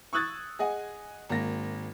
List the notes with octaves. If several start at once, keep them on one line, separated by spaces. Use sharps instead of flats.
C#6 D#6 E6 F#6 G#6 A6
G#4 D#5 F#5 G#5
G#1 A#3 A#6